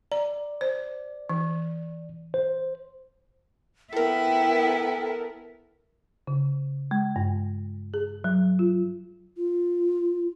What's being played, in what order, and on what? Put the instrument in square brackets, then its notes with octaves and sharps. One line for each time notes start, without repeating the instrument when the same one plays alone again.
[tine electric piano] D5 [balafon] A#5
[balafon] C5
E3
[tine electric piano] C5
[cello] B3 E4 [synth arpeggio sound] A4 A#4 [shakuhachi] G5
[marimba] C#3
G#3
G2
G#4
F#3
F4
[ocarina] F4